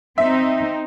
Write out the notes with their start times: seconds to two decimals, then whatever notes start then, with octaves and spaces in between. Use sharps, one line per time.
0.18 C4 D#4 E5